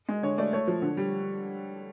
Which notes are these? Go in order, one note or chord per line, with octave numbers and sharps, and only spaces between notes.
G#3
D3 C#5
A3 D5
A3 C#5
F3
D3
G3